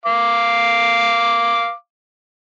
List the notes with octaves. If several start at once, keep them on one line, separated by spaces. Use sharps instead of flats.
F5 D6